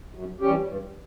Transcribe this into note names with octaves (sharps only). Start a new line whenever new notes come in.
F#2
E3 G3 C#4 G4
G2